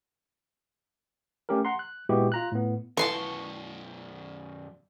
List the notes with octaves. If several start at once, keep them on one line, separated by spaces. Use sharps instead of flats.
A3 C#4 G4 A4 A#4
F#5 A#5 C6
F#6
A#2 G#3 B3 E4 F#4 G4
F4 A#5 F#6
A2 B3
F#2 B2 E3 B3 F4 A5 C6 C#6